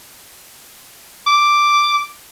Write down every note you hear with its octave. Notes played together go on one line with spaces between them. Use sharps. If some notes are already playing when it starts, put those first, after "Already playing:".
D6